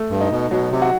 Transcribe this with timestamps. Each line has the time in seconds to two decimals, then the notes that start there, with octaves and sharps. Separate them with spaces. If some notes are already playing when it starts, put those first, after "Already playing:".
Already playing: A3
0.10 G2
0.20 D#4
0.31 B2
0.51 B2 F#3
0.72 C3
0.82 F#4